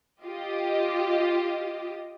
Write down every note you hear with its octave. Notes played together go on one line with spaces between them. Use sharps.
F4 G4 D#5